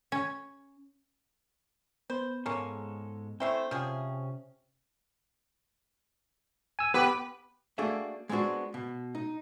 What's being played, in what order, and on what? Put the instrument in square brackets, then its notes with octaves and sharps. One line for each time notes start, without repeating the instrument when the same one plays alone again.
[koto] C#4
[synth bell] B3 [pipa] C5
[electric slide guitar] G#2 G#3 A4 [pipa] A#3 C#4
[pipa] A3 C#4 E4 [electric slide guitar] C4 [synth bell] C5 E5 G5
[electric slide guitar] C3 C#4 [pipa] F3 G#4
[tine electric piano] G#5 E6
[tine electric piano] B3 G4 [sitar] B4
[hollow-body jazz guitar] A3 A#3 D4 F#4 G#4 E5
G#3 B3 C4 D4 F#4
B2
D#4